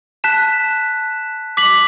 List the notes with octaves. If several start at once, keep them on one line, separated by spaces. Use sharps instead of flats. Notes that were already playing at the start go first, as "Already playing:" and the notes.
A5 F#6 B6 E7
D6 B6 F#7